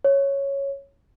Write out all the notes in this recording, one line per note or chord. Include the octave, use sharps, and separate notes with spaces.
C#5